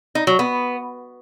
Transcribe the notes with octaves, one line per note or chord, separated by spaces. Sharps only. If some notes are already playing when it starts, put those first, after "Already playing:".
D#4
F#3
B3